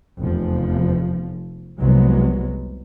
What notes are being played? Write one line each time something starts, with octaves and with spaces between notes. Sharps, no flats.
F1 E2 F3
F1 C2 F#3 G#3 B3